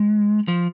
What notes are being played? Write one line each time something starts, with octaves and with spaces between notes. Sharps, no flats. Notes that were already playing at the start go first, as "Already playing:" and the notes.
Already playing: G#3
F3